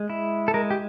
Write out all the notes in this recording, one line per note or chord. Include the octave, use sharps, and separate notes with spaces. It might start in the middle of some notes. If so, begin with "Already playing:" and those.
Already playing: G#3
E4
A4
G#3 A#4
G4